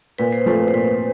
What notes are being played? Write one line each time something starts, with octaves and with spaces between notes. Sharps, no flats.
A#2 B4
C5
F3 A3 C4 B4
C5
A#2 B4